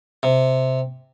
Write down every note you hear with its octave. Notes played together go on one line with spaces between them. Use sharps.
C3